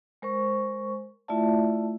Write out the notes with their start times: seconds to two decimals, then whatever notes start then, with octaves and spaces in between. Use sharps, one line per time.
0.22 G#3 A#4 C5 C#6
1.28 A3 E4 F4 D5 E5 A5